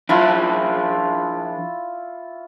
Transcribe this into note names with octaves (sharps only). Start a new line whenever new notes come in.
F3 D4 E4 F4 C#5 E5